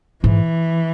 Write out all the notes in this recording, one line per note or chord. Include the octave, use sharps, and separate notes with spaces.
G#2 E3